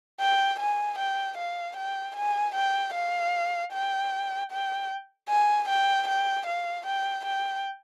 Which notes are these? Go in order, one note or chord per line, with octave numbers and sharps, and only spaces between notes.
G5
G#5
G5
F5
G5
G#5
G5
F5
G5
G5
G#5
G5
G5
F5
G5
G5